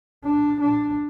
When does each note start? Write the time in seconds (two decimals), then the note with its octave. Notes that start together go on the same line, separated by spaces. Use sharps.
0.24 D4
0.61 D4